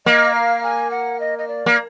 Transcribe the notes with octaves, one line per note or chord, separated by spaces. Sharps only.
A#3 D#5
F5
G#5
F#5
D#5
D#5
D5
A#3